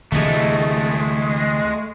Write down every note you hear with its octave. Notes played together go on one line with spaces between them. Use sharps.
D2 C3 E3 G#3 A3